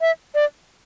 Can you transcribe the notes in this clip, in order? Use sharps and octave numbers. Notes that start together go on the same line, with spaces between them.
E5
D5